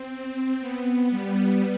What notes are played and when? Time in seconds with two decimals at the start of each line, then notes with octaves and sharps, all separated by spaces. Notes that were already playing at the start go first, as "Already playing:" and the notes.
Already playing: C4
0.10 C4
0.60 B3
1.10 G3